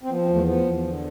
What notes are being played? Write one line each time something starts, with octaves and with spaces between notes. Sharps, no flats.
C4
F3 B3
C4
E2
A3
F3 B3
E2
D3